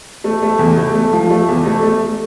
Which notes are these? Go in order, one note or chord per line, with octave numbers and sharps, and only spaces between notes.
A3
A3
E2
A3
A3
F3
A3
E2
A3
A3